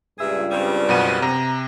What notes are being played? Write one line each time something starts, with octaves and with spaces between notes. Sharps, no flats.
C#2 G2 A#2 G#4 E5
C#3 G3 C4
F#2 B2 B3 D#7
C3 A#5